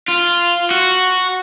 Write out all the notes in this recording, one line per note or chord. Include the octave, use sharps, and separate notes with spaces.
F4
F#4